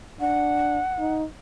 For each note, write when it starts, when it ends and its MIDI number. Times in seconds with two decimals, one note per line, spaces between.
0.21 0.79 62
0.21 1.13 78
0.99 1.24 63